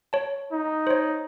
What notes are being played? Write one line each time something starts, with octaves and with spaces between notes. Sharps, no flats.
C#5 A5
D#4
C5 C#5